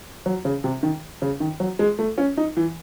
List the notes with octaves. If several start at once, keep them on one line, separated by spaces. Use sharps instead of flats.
F#3
C#3
C3
D#3
C#3
D#3
F#3
G#3
A3
C#4
D#4
E3